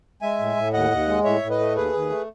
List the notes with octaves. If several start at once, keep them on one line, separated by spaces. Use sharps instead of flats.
G#3 E5 G#5
A2
A2
D#2 D#5 F#5
D#2
G#3
A2 C#5 E5
A2
B4 D#5
A3
D#2 G#4 B4
D#2
A3